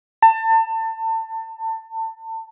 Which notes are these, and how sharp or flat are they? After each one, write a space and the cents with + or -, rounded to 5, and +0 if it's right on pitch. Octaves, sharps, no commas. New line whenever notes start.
A5 +30